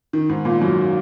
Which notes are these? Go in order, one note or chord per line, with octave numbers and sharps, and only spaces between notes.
D#3
G#2
A#2
F#2